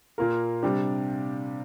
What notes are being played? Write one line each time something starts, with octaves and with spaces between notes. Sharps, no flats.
A#2 A#3 F4 A#4
C3 G3 D4 G4